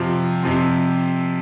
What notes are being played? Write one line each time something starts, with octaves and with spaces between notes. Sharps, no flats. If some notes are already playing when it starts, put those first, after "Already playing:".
Already playing: F2 C3 F3 C4
F2 C3 F3 C4